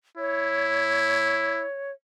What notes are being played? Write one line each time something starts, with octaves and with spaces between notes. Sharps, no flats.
E4 C#5